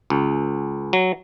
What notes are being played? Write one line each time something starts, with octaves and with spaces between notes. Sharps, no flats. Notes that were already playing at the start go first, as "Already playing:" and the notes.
C#2
F#3